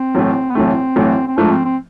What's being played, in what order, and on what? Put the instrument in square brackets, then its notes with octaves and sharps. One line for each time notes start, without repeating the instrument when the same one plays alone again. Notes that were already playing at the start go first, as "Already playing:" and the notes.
Already playing: [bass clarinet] C4
[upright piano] B1 A2 E3 A3
[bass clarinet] B3
[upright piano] B1 A2 E3 A3 [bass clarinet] C4
[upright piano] B1 A2 E3 A3
[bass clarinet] C4
[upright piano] G#2 F3 A3 [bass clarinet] D4
[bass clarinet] C4
C4